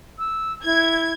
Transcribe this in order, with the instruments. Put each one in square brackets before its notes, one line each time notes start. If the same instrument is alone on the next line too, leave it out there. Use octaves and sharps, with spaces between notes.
[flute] E6
[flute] E4 [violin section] G#6